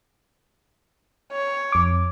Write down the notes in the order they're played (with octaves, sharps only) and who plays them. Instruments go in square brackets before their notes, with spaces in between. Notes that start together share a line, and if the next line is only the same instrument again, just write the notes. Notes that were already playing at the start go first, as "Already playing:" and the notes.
[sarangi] C#5
[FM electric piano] F2 D6